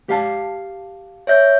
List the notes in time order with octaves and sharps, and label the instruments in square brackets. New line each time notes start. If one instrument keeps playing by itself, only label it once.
[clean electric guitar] G4 F5 A5
[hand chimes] C#5 E5 G6